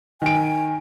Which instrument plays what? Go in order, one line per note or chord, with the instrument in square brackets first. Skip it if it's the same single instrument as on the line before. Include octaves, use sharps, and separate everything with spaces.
[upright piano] D#3 D7 [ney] G#5